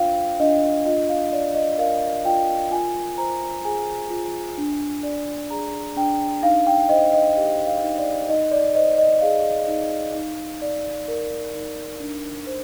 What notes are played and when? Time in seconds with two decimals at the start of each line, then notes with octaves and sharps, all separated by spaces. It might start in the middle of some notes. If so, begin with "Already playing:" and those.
Already playing: D4 F4 C5 F5 G5
0.40 D4 D#5
0.86 F4 D#5
1.09 F5
1.32 D5
1.55 D#5
1.78 A#4 F5
2.25 F4 G5
2.71 F4 G#5
3.18 C5 A#5
3.65 G#4 G#5
4.10 F4
4.58 D4
5.03 D5
5.50 G#4 A#5
5.96 D4 G5
6.42 D#4 F5
6.67 G5
6.89 C5 D#5
7.13 D#5
7.36 G4 D#5
7.67 F5
7.83 D#4
7.98 D5
8.29 D#4 D#5
8.51 D5
8.75 C5 D#5
8.98 D#5
9.21 G#4 F5
9.68 D#4
10.15 D#4
10.62 D5
11.08 A#4
11.54 D#4
12.00 D4
12.47 C5